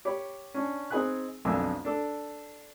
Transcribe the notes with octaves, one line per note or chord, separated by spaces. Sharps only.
G4 C#5 B5
C#4 D4
C4 D#4 G#4 G#5 B5 F#6
B1 F2 D3 D4 G#5 E6
D4 A4